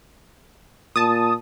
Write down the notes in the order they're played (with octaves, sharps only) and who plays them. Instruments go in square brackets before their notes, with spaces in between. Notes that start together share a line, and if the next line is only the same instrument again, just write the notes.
[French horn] A#2 [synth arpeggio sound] A5 D#6